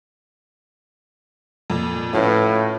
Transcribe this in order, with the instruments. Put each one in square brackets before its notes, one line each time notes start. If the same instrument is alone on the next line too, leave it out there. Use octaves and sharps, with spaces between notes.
[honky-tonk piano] F2 A#2
[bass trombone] A2 [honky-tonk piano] C#4 F4 B4